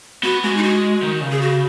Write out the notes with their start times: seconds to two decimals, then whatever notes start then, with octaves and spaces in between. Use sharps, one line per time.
0.23 B3 F#4
0.44 G#3 F#4
0.57 D#4
0.63 F#4
1.02 D#3
1.21 C#3
1.32 G#4
1.41 F#4